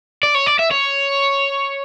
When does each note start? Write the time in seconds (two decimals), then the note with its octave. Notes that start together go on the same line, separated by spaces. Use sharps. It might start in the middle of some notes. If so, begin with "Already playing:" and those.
0.23 D5
0.35 C#5
0.47 D5
0.59 E5
0.71 C#5